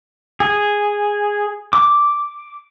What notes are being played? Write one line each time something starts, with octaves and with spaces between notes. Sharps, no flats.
G#4
D6